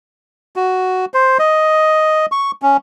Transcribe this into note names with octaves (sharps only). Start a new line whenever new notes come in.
F#4
C5
D#5
C#6
C#4